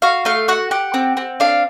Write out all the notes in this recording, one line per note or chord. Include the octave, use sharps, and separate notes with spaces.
F#4 F5
A3 F5
F#4 F#5
G4 F#5
C4
C4
D4 F5